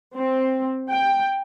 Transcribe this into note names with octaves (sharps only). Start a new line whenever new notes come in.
C4
G5